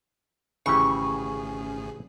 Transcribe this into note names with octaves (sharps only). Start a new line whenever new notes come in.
G#1 A2 C#3 E3 C#4 G4 G#4 C#6